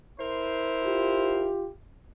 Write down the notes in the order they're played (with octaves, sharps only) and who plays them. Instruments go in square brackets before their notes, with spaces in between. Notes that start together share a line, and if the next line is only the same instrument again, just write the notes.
[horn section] E4 A#4 C5
[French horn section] F4 G4